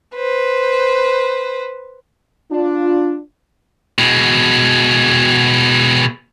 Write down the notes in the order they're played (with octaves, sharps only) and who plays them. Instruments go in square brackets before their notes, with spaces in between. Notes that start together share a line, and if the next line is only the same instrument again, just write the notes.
[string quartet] B4 C5
[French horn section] D4 F4
[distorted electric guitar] B2 G#3